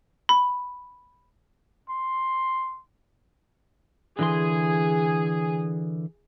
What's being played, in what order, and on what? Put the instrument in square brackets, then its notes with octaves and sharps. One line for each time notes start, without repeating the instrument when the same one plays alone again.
[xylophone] B5
[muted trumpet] C6
[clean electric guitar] D3 E3 C6 [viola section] G#4